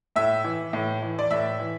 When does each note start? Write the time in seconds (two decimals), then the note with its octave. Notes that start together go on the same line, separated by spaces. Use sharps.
0.16 A2 E5
0.44 E3
0.73 A2
1.02 E3
1.19 D5
1.31 A2 E5
1.60 E3